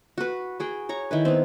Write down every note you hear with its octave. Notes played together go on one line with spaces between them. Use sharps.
F#4 B4
F#4 G#4 G5
C#5 A#5 C#6
D#3 E4 B4
B3 C4